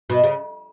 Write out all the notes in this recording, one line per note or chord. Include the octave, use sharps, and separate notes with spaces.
B2
C#3